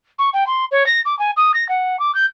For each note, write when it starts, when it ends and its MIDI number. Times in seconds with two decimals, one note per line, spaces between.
0.19 0.30 85
0.34 0.47 79
0.47 0.65 84
0.71 0.86 73
0.87 1.01 94
1.05 1.17 86
1.19 1.31 80
1.37 1.52 87
1.54 1.67 94
1.69 1.99 78
1.99 2.14 86
2.15 2.26 91